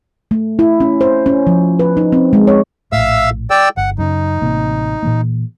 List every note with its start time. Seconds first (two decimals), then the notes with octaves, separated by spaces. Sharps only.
0.31 A3
0.59 E4
0.80 C#4
1.01 C5
1.26 C#4
1.47 F3
1.79 B4
1.97 D#4
2.13 C4
2.33 G#3
2.47 C#5
2.92 A#1 A2 E5 F5 E6
3.50 D5 G5 E6
3.77 G1 F#5
3.98 F#2 C#3 D#4
4.42 A1 C3 A#3
5.03 A#2 E3 A#3